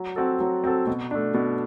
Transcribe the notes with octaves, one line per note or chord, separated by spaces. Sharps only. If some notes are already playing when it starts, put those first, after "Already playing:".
Already playing: F#3
C4 F#4 A4
F#3
C4 F#4 A4
B2
A3 D4
B2